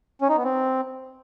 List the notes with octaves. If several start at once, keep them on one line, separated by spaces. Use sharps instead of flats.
C#4
D#4
B3
C4